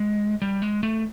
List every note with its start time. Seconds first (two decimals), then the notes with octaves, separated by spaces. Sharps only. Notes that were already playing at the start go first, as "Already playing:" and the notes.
Already playing: G#3
0.42 G3
0.62 G#3
0.83 A3